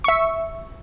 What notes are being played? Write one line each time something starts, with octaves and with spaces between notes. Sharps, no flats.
E5 C#6